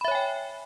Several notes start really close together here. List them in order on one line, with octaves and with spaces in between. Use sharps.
B5 E5 C#5 G#5 G5